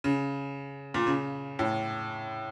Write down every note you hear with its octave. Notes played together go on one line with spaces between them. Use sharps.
C#3
A#2
C#3
A2